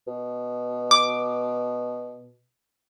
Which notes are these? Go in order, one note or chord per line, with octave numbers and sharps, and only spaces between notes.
B2
D6